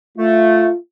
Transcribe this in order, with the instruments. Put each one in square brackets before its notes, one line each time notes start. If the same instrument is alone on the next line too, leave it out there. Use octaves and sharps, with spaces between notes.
[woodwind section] A3 [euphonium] F4